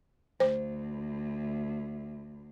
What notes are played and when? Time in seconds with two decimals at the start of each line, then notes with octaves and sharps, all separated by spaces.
0.40 D2 C5